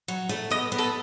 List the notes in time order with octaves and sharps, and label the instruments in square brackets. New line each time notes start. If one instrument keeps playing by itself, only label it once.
[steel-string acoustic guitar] F#3
A3
[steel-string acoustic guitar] B3 [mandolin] D#5
[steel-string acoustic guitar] B3
[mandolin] A4